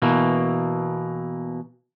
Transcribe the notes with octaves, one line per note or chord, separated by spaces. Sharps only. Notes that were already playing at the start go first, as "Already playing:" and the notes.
B2 E3 A#3